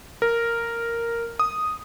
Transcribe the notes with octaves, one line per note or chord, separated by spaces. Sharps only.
A#4
D#6